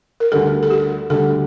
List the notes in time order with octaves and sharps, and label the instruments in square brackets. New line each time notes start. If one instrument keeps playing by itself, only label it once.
[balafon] A#4
[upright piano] D2 D3 G3 [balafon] A4
[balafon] A4
G4
[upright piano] D2 D3 G3 [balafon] A4